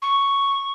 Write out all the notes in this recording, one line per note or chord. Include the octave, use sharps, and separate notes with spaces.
C#6